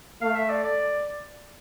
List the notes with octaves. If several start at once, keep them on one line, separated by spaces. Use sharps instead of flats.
A3 F5
E5
D5
D5